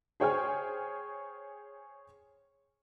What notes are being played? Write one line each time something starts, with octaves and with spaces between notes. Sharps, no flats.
G#4 C5 C#5 G5 G#5 F6